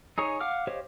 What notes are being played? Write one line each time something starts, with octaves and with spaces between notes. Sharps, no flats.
D#4 G#4 C#5
F5 F#5 D6 F6
G4 C5 C#5 D#5 F5